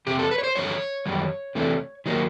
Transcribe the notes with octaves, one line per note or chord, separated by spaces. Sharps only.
F2 C3 G4
A4
B4
C#5
C5
G2 D3 F3 C#5
F#2 D#3 G3
C3 E3 A3 D4
D#3 F#3 A#3